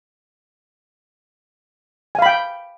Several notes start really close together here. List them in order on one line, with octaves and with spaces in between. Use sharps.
G#5 F5 B5 G5